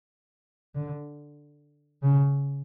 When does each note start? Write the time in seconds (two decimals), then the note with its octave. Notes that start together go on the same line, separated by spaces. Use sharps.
0.75 D3
2.03 C#3